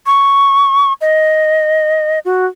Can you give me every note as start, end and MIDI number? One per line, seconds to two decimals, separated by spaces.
0.06 0.93 85
1.01 2.19 75
2.25 2.46 66